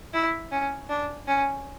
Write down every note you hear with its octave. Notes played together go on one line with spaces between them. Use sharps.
E4
C#4
D4
C#4